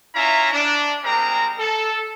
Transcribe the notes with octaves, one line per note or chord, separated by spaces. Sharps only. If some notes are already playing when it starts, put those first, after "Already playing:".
C#4 E4 F4 E5 A#5
D4
G3 G#3 C4 A#4 A#5
A4